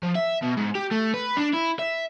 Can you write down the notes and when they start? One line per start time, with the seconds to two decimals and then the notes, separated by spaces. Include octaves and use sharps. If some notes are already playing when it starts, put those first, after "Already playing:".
0.03 F3
0.15 E5
0.42 B2
0.57 G#2
0.75 G4
0.91 A3
1.14 B4
1.37 D4
1.53 E4
1.79 E5